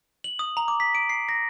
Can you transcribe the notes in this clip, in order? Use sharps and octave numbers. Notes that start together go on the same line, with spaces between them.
F#7
D#6
A#5
D6
B6
D7
C7
A#6